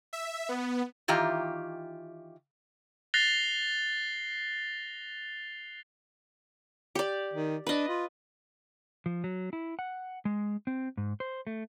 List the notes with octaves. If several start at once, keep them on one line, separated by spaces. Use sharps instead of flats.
E5
B3
D#3 E3 F4 G4 A#5
F#6 A6 A#6 C7 F7 G7
G4 D5
D#3
D4 B4 D#5
F4
F3
F#3
E4
F#5
G#3
C4
G#2
C5
A3